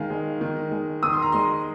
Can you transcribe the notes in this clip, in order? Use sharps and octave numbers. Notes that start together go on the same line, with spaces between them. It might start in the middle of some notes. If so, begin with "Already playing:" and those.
Already playing: D#3 G#3 F5
G#3
D#3
G#3
D#3 D#6
C6
A#5
G#3 C6